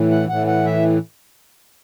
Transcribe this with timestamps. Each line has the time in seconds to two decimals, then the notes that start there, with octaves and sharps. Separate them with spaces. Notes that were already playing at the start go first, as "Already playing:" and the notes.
Already playing: A2 E3
0.11 F#5
0.29 A2 E3 F#5
0.47 F#5
0.65 E5